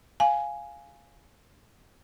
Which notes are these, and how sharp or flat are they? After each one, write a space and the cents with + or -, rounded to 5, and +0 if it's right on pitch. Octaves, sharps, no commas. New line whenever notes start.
F5 +0 G#5 +5